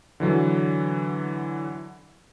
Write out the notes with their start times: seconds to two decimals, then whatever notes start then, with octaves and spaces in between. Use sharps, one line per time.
0.20 D3 E3 F#3